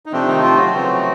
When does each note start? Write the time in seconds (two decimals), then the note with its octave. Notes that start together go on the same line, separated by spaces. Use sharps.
0.06 D#4
0.12 C3 F3 A3 C4 D4
0.27 D#3 D#4
0.42 F3 F4
0.57 F#3 F#4
0.72 C#3 E3 A3 C4